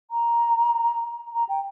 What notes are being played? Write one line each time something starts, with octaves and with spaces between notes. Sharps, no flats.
A#5
A#5
G5